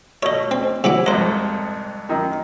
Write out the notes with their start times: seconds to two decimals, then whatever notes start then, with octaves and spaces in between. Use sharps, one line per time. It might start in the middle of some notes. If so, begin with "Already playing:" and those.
0.23 B2 A3 C#5 D#5
0.51 C4
0.84 C3 F#3 E4 D6
1.06 C2 F2 G#2 C5 D#5
2.09 F#2 D#3 D#4